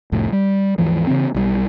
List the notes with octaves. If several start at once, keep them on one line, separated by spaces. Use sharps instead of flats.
C2 F2 A2
G3
D#2 G#2 E3 F3
C#3 E3 C4
B1 E3 G3